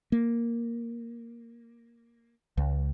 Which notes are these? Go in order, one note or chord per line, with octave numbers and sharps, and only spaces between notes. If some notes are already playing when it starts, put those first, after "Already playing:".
A#3
C#2